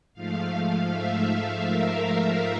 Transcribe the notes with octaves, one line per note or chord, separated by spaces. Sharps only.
G#2 F3 A3 F5
E5
A#4